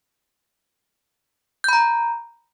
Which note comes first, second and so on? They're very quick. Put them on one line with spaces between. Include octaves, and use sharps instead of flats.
G6 B5 A#5